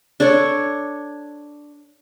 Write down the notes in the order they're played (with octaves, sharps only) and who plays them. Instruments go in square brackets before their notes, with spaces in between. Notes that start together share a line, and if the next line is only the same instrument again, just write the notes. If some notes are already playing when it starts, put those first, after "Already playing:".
[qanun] D4 A4 C#5 D5